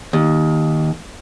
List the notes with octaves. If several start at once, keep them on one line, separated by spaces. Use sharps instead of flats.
D#2